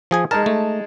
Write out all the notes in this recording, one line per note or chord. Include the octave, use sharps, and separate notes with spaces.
F3 G#4 G#5
G#3 D#4 A#4 A5
A3